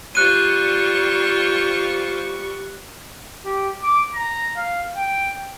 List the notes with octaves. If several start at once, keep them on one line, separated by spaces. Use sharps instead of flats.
G3 F4 C5 C#6 F#6 D#7
G4
D6
A#5
F5
G5